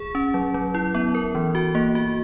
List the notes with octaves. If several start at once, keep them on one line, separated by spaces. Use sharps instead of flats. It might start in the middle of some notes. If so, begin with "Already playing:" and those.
Already playing: G#4
C#4
F#3
F#3
E4
B3
A#4
E3
F#4
A#3
F#4